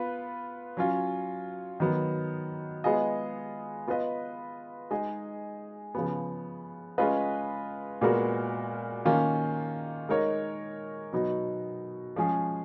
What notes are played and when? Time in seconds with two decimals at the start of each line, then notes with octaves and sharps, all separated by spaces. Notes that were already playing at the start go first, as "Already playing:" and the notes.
Already playing: B3 F4 B4
0.77 F#3 C#4 F4
1.80 D#3 F#3 B3
2.84 G#3 B3 F4 G#4 D#5
3.87 B3 F4 B4 D#5
4.91 G#3 D#4 G#4 D#5
5.95 C#3 F3 B3
6.98 G#3 C#4 F4 B4 D#5
8.01 A#2 G#3 B3 F#4 A#4
9.05 D#3 A#3 C#4 F4
10.09 G#3 D#4 A#4 C#5
11.13 B2 F#3 B3 D#4
12.16 F3 G#3 C#4 G#4